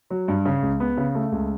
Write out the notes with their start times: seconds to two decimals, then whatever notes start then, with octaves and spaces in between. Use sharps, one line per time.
0.10 F#3
0.28 G2
0.45 C#3
0.63 C#2
0.80 B3
0.97 C#3
1.15 A3
1.32 C#2